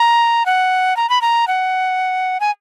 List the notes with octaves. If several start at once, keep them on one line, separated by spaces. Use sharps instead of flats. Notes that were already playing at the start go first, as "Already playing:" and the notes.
Already playing: A#5
F#5
A#5
B5
A#5
F#5
G#5